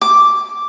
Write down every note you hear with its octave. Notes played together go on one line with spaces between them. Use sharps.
D6